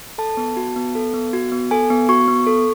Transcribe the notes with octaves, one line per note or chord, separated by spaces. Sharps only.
A4 A5
B3
F#4
B3
A4
B3
F#4
B3
A4 G#5
B3
F#4 C#6
B3
A4